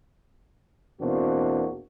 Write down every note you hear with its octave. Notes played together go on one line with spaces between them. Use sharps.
E2 B2 A#3 C4 D4 F#4